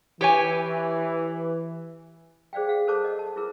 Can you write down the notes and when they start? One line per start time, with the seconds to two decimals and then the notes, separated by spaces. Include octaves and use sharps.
0.21 E3 G4 C#5 G#5
2.53 G#4 C5 D5 F5 G5
2.67 G#4 F5 F#5
2.87 A4 A#4 C5 C#5 A5 D6
3.04 D#5 F#5
3.19 A5
3.36 E4 F4 G#4 A#4 B4